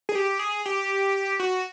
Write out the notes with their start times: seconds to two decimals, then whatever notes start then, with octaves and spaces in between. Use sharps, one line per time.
0.09 G#4
0.15 G4
0.39 G#4
0.66 G4
1.40 F#4